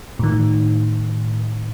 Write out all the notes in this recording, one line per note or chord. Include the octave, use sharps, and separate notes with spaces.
A2 D#3